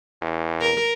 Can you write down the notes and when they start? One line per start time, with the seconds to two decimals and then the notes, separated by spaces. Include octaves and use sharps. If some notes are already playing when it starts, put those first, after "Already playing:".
0.22 E2
0.61 A#4